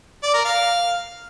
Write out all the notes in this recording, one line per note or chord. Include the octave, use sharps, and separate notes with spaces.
D5
A#4
F5